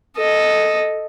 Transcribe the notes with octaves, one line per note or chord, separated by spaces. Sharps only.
A4 D#5